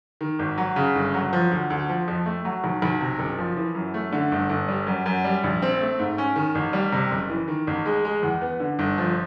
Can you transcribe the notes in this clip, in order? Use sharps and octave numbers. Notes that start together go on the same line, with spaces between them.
D#3
G#1
F#3
C#3
G1
F#3
F3
D2
D2
F3
F2
A3
F#3
B1
B1
C3
F#1
F3
E3
F#2
A3
D3
G1
G1
G3
F#2
F#2
G3
A#1
C4
A3
G#2
C#4
D#3
A1
G3
C3
F#1
E3
D#3
A1
G#3
G#3
E2
B3
D3
G1
F3